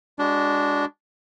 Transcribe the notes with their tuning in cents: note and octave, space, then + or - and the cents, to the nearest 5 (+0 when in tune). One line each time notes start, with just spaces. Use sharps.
G#3 -25 D4 -10 F#4 +0